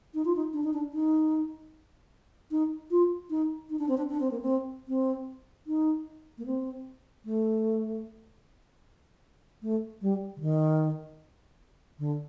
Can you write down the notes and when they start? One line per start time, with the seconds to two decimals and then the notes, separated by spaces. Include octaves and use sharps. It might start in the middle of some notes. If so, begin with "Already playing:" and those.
0.14 D#4
0.25 F4
0.36 D#4
0.54 D4
0.64 D#4
0.74 D4
0.93 D#4
2.51 D#4
2.91 F4
3.30 D#4
3.70 D#4
3.79 D4
3.89 C4
3.98 D4
4.10 D4
4.20 C4
4.31 A#3
4.42 C4
4.88 C4
5.67 D#4
6.38 A#3
6.46 C4
7.25 A3
9.62 A3
10.02 G3
10.36 D3
10.41 D#3
11.99 D3